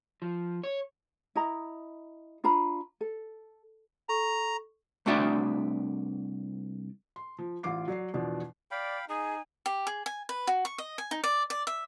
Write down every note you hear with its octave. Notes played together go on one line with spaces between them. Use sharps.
F3
C#5
E4 D#5 A#5
D4 F4 A#5 B5
A4
A4 A#5 C#6
C2 A3 D4 F#4 D5 E5
C6
F3
A1 F4 F5 D6 C7
F#3 D5 C7
E2 B2 F3 D4
D5 F5 G5 B5
D#4 G#4 G#5
G4
G#4
G#5
B4
F#4
C#6
D#5
G#5
D#4
D5
D5
E5